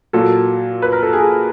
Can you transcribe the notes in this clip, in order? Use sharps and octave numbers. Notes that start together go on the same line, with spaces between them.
A#2 F#3 A4
B4
A#4
A4
G#4